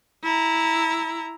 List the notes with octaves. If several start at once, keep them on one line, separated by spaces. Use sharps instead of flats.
E4 A#5